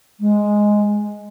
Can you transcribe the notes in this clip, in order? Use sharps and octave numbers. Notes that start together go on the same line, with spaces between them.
G#3